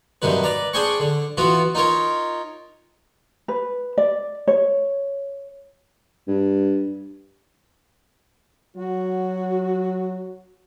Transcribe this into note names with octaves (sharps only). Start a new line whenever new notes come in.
G2 C3 D#3 F#3 B4
B4 D5 A#5
D4 G#4 C5 G5 G#5 C#6
D3
E3 B3 F4 F#4
D#4 F4 A#4 C#5
B4
D5
C#5
G2
F#3 F#4